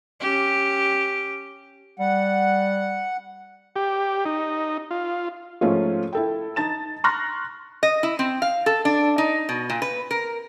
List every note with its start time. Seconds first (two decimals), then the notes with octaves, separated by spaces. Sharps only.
0.20 C#4 G4
1.99 G3 F#5
3.76 G4
4.25 D#4
4.91 F4
5.61 G#2 F3 A3 C#4 F4
6.13 E4 A4 G5
6.56 D#4 A5 A6 E7
7.04 A#5 C6 C#6 F6 F#6 A#6
7.83 D#5
8.03 E4
8.19 C4
8.42 F5
8.66 A4
8.85 D4
9.18 D#4
9.49 B2
9.70 A#2
9.82 B4
10.11 A#4